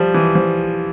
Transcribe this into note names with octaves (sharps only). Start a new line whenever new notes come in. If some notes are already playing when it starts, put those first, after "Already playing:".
Already playing: F3 G3
E3
F3